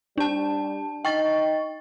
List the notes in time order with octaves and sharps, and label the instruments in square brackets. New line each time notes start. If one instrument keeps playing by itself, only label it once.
[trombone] G3 [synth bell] D4 A5
[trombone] D#4 [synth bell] G5 C#6 A6